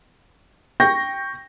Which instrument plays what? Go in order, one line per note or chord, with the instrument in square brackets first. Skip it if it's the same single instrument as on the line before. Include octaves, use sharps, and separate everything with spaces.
[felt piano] G5 C#6 G6 A#6